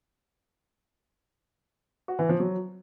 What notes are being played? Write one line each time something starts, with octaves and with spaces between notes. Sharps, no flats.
F#4
E3
F3
F#3